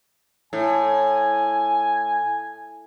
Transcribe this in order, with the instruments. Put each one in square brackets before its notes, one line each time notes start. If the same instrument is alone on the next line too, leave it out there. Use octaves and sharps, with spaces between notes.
[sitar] A2 [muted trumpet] G#5